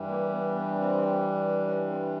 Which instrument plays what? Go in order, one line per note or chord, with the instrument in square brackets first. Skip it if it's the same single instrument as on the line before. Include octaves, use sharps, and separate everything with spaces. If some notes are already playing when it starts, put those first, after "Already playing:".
Already playing: [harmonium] G2 E3 G3
A#3
B3
B3
C4
C#4
C4